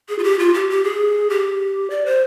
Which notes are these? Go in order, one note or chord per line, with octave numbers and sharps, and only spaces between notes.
G#4
F4
G4
F4
G4
G4
G#4
G4
D5
C5